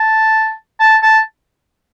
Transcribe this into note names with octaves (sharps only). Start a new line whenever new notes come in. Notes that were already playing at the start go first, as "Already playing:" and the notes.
Already playing: A5
A5
A5